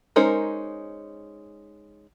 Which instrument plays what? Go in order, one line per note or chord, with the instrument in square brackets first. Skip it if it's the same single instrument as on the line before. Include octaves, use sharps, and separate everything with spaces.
[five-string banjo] G#3 C#4 D#4 A#4 C5